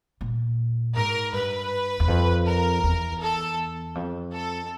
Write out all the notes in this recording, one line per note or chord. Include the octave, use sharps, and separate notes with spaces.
A#2
G#2 A#4
G2 B4
E2
F2
A#4
E2
A4
F2
A4